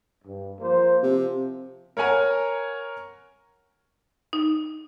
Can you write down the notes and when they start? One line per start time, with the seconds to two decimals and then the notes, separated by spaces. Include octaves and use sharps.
0.25 G2
0.60 F3 A#3 C5
1.03 C3 F3
1.97 A#4 C#5 F#5 G#5 A#5
4.33 D#4